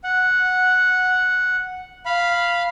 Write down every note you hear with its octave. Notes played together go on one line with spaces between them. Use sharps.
F#5
F5 B5